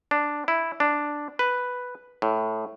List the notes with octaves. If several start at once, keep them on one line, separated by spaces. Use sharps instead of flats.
D4
E4
D4
B4
A2